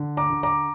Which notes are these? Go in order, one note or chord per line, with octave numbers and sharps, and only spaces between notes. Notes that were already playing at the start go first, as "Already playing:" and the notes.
Already playing: D3
A#5 D6
D3
A#5 D6